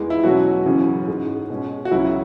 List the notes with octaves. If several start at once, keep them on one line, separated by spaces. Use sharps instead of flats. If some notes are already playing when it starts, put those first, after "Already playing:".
Already playing: E2 E3 G#3
E4
B2 F#3 C#4 F#4
F#2 C#3 E3 C#4
G#2 G#3 C#4
B2 G#3 C#4
F#4
C#2 C#3 F#3 C#4 E4